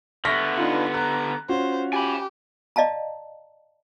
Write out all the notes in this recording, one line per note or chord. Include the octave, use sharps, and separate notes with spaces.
D3 B3 E5 C#6 F6 A#6 B6
D4 D#4 F4 B4
A#5 F#6
C#4 F4 F#4 C5
G4 G#5 B5
D5 D#5 F5 A5 A#5